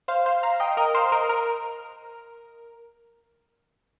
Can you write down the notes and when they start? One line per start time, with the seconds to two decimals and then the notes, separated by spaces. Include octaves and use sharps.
0.08 C5 F5
0.26 C5 F5
0.43 F5 A#5
0.60 D#5 G5
0.77 A#4 D#5
0.95 C5 F5
1.12 A#4 D#5
1.29 A#4